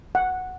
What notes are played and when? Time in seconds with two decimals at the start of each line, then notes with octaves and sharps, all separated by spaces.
0.15 F#5